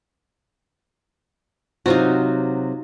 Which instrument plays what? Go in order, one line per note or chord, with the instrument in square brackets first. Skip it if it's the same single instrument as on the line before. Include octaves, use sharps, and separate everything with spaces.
[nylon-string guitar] C3 F#3 [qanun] D#4 F4 F#4